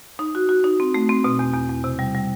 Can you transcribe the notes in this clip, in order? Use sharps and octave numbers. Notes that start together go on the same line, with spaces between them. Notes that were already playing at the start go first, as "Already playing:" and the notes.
D#4
F#4
F#4
D#4
C4
A3
C4
B2
E2
E2
E2
C3
G3
G3